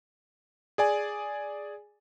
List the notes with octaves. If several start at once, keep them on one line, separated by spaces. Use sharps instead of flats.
G#4 D5 G#5